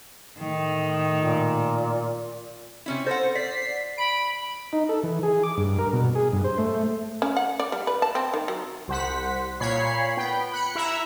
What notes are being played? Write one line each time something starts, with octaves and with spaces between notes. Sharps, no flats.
A2 D#3
A#2
C3 C#4 E4
A4 C5 F#5 A#6
D5 B6 C7
B5 D7
D#4
A4
E3
G#4
D6
G2
A#4
B2
G#4
G2
C5
A3
C#4
F#5
D5
G3
B4
A5
C4
D#3
F#3
C2 C5 F#5 B6
A#2 C#5 B5 C7
B3 G5 B5
B5 F#6 C#7
E4 E5 A#5